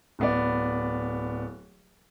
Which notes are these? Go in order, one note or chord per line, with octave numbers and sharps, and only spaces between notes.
D1 B3 D5